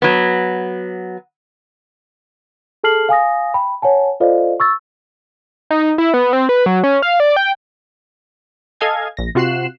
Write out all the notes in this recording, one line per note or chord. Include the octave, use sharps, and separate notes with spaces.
F#3 B3
G#4 A4 A5 F6 C7 F#7
F5 G#5 D#6 A#6
G5 B5
C#5 F#5 G#5 A5
F4 A4 C5 D5 D#5 F5
C#6 E6 A6
D#4
E4
B3
C4
B4
F#3
C#4
F5
D5
G5
A4 D#5 F5 G#5 G#6
A#1 A#6
C3 F4 F#4 F#6 C7 E7